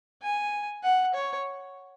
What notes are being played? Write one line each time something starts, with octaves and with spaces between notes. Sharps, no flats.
G#5
F#5
C#5